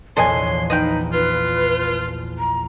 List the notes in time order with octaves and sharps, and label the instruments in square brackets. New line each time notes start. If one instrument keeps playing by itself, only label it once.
[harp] A#1 E2 [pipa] A4 D#5 G#5 [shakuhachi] C#5 [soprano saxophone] C6
[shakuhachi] D#4 [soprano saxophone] B4 [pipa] D#5 F5 G5
[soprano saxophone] F4 [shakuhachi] B4
[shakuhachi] A#5